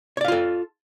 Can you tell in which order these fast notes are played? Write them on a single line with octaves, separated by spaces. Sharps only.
C#5 D5 F5 F4 A4